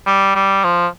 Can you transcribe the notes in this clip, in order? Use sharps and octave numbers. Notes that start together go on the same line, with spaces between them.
G3
G3
F3